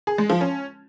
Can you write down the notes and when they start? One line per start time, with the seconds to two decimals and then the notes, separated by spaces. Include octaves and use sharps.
0.07 G#4
0.18 G#3
0.30 F3
0.41 C#4